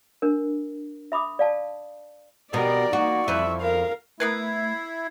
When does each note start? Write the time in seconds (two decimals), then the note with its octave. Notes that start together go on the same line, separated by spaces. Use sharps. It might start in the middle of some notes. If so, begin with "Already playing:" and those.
0.22 D4 A#4
1.12 E5 B5 D6 D#6
1.39 D5 F5 A5
2.53 B2 B3 G4 A#4 D5
2.93 A#3 D#4 F#4 C#6
3.28 F2 E4 B4 E5
3.62 A#4 F5
4.20 A3 B3 E4 A#4 B4 G#6 C7